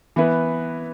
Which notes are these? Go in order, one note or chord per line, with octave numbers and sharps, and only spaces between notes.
E3 B3 E4 B4